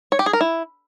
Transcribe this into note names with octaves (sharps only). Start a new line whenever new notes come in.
C#5
G4
G#4
A#4
E4